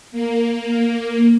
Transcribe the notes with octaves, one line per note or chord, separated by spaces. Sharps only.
A#3